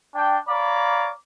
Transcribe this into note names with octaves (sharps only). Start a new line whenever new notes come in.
D4 G5
C#5 D5 F5 A#5 B5 D6